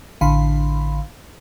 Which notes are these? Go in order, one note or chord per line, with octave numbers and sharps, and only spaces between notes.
A1 D3 F5 B5 C6